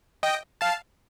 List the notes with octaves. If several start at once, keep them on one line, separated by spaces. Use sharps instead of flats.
D#5 G5
F5 A5